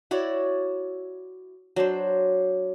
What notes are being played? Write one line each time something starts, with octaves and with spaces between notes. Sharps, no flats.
E4 F#4 C#5 D5
F#3 D4 C5